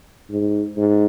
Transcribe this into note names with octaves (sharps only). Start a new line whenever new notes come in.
G#2
G#2